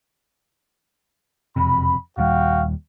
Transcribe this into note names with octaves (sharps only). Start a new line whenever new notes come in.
E1 F2 C3 B5
D#1 D#2 G3 F#4 F5 G5